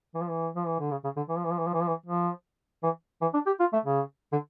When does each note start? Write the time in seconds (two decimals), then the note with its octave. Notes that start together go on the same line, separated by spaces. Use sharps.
0.15 E3
0.21 F3
0.29 E3
0.56 F3
0.67 E3
0.79 D3
0.91 C#3
1.04 C#3
1.16 D3
1.29 E3
1.37 F3
1.44 E3
1.51 F3
1.58 E3
1.66 F3
1.74 E3
1.81 F3
1.88 E3
2.06 F3
2.83 E3
3.22 E3
3.34 D4
3.46 G4
3.60 F4
3.73 A3
3.85 C#3
4.32 D3